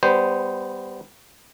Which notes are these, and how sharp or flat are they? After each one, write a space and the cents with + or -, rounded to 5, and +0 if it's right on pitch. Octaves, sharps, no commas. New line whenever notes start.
G3 +0 B3 +10 C5 -10